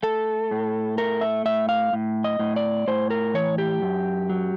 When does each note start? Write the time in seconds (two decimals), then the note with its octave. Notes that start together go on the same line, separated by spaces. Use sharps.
0.03 A3 A4
0.51 A2
0.98 A3 A#4
1.21 E5
1.45 A2 E5
1.69 F5
1.93 A2
2.24 D#5
2.39 A2
2.56 D5
2.88 A2 C5
3.10 A#4
3.34 E3 C#5
3.58 G4
3.82 F#2
4.29 F#3